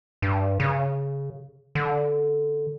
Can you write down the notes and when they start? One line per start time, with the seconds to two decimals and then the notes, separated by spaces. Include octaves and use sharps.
0.22 G2
0.60 C#3
1.75 D3